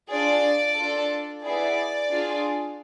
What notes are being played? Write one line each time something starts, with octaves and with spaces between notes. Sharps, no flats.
D4 F4 G#4 D5
D4 F4 A4
B3 E4 G#4 D5
D4 F4 G#4